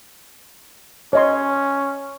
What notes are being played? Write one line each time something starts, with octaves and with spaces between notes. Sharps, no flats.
C#4 C#5 D#5 C6